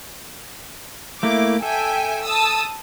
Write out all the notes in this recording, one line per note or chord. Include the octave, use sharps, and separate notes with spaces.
A3 A#3 E4 D6
A4 E5 G5 G#5
A5 D#6 E6